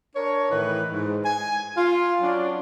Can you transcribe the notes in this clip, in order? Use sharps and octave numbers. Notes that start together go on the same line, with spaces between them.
D4 A#4 C#5
A2 D#3 E3 B4
G#2
G#5
F4
F#3 C#4 D4